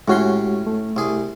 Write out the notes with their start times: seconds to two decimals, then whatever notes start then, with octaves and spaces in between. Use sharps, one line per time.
0.08 A2 G#3 C#4 F#4 G4 C6
0.67 A3
0.96 C2 G#4